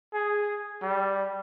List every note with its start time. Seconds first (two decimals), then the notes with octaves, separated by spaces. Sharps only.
0.13 G#4
0.82 G3